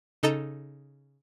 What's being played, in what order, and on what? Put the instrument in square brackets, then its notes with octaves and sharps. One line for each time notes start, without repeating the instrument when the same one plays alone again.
[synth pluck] C#3 D#4 A4 D#5 A#5 A6